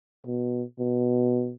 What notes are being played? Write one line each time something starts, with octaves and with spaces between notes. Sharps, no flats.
B2
B2